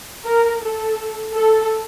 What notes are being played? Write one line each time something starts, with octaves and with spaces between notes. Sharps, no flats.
A#4
A4
A4